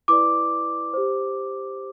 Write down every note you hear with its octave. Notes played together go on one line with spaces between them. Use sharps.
E4 B4 D5 D6
G4 C5